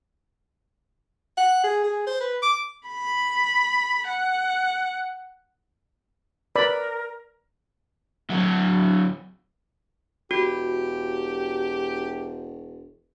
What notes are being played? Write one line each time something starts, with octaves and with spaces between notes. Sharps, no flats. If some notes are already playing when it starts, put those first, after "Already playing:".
F#5
G#4
G#4
C5
B4
D6
B5
F#5
A#4 B4 D5 B5
D2 F#3
E1 F#4 G4